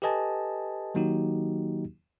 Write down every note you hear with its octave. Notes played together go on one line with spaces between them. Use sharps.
G4 A4 B4 D#5 G#5 A5
D#3 F#3 A#3 D#4 F#4 G4